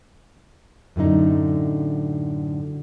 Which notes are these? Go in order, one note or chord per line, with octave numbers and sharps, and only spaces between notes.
F#2 A2 D3 D#4